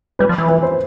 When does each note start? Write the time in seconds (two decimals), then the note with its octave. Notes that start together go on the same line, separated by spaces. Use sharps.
0.19 G3 B4
0.29 F3
0.38 E3
0.49 B4
0.63 C5